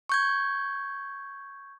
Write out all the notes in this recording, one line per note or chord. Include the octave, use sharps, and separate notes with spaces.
C#6 G6 G#6